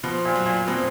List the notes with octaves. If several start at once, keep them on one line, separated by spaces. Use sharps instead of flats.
B2 F3
A#2
F#3
A#2
B2 C4